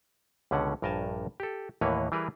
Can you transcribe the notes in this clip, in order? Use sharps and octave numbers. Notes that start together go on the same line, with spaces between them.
C#2 B2 D3 C#4 F#5
A#1 G2 A#4 D#5 G#5 A5
G4 A4
D#2 A2 E3 A#3 B4 C#5
E3 G3 E4 G#4 A#4 B4